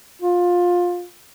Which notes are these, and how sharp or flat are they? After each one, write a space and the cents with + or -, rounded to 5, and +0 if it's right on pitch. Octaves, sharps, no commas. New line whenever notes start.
F4 +20